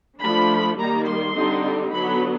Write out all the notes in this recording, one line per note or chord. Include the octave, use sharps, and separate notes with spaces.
F3 A3 D4 B5
D#3 G3 A#3 A#5
C6
D3 G3 C4 D#4
D3 F#3 B3 B5